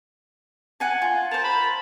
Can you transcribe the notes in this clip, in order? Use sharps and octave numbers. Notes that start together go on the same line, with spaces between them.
F#5 G#5 A5
F4
A#4 C5 A5
B5